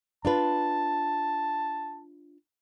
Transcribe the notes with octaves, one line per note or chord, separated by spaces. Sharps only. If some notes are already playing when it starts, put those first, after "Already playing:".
D4 F4 B4 A5